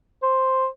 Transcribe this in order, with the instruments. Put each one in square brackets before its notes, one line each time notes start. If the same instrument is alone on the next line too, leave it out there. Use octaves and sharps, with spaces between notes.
[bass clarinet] C5